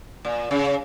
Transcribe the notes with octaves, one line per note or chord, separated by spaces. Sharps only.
A#2
C#3